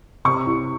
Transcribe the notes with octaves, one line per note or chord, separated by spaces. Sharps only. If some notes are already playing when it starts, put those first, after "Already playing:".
C3 C#6
C2